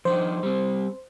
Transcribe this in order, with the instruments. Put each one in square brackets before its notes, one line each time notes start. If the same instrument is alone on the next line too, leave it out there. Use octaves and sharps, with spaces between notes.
[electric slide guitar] F3 D4 D#4 [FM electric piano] C5
[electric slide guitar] G3 C4